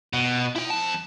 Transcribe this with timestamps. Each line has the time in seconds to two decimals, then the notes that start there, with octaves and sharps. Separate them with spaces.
0.13 B2
0.56 E4 G5
0.71 F2 A5